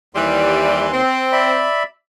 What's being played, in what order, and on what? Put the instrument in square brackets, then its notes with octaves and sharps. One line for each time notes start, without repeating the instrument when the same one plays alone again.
[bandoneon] D#2 C6 [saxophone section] E3 G3
[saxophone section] C4
[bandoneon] D5 E5 B5